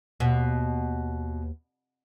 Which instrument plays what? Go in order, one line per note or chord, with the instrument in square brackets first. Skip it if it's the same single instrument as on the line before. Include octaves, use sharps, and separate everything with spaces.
[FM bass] D#2 [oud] B2